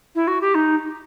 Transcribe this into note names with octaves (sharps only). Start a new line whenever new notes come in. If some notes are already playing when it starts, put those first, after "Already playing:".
E4
F#4
G4
D#4